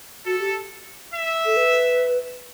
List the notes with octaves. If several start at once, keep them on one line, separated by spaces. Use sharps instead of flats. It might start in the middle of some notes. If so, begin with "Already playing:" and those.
F#4 A4
G4
E5
A4
B4